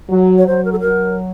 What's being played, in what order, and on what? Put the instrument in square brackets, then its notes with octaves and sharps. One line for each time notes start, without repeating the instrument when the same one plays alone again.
[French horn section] F#3
[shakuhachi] C#5
[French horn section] F#3 [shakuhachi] C5
[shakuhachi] A#4
A4
[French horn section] F#3 [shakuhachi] A#4